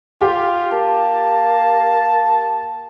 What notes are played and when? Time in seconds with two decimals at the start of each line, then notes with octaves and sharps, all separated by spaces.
0.21 F4 G4
0.72 A#3 A5